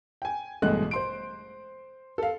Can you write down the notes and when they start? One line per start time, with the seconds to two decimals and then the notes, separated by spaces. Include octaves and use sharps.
0.22 G5 G#5
0.62 A1 G2 B2 G#3 A3 F#6
0.91 C5 C6 D7
2.18 A4 F5